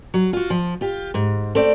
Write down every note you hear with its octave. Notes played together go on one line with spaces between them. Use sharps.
F#3
F4 F#4
F3
F4 G4
G#2
A3 C4 D5